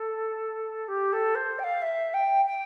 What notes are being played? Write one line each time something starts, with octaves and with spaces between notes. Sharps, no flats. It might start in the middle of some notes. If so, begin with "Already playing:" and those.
Already playing: A4
G4
A4
C5
G5
F5
E5
G5
G5